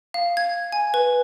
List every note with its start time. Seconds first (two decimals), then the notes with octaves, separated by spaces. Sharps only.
0.14 F5
0.37 G#6
0.72 G#5
0.94 B4